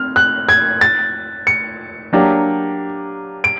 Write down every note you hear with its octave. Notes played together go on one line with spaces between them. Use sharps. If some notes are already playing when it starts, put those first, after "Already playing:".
Already playing: C4 F6
F#6
G#6
A6
C#7
F#3 A#3 D4 G4
D7